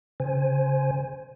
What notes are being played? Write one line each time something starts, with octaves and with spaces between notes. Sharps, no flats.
C#3 C5 G#5